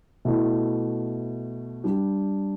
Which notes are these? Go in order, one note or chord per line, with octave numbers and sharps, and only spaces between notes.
B2 A3 E4
G3 D4 G4